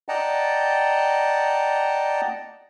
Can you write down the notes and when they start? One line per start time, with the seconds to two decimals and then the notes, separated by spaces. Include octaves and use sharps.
0.09 D5 D#5 F#5 G5 A5 A#5